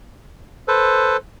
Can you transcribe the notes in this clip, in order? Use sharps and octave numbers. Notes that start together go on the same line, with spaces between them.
A4 B4 C5